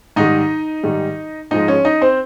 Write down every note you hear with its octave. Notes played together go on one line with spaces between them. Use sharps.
G#2 D#3 G3 D#4 D#5
G#2 D#3 G3
G#2 F3 G#3 D#4 D#5
C#4 C#5
D#4 D#5
C4 C5